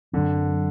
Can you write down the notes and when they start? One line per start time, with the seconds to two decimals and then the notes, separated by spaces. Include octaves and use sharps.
0.13 F#2 D3 F#3 C4